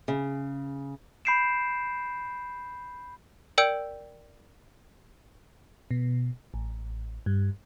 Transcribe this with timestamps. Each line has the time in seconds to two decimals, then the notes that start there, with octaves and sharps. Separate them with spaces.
0.08 C#3
1.25 B5 G6 C7 D7 E7
3.58 A#4 D5 G5 E6 G6 D7
5.91 B2
6.54 A1
7.26 G2